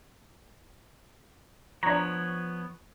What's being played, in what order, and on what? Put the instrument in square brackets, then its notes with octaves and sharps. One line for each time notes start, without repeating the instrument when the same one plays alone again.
[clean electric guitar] F3 B3 C#5 [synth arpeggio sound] D4 A#5